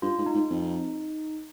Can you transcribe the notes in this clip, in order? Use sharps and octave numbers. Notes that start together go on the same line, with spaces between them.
G2 F4
G#2
D#4
G#2
F2